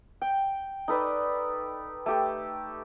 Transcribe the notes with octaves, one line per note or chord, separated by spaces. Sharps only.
G5
D#4 A4 B4 D5
A3 G4 A4